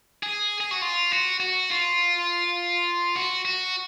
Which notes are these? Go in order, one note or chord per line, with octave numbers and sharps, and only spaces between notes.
G#4
G#4
F#4
F4
F#4
F#4
F4
F#4
F#4